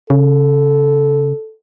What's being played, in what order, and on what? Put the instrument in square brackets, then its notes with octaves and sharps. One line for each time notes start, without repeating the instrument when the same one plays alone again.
[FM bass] C#3 [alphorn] A4